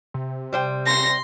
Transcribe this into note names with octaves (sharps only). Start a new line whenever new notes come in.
C3
G3 C5 G5
C6 A#6